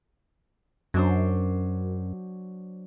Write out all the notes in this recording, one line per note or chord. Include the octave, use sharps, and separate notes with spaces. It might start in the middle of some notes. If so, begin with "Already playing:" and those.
F#2 F#3 D4 C5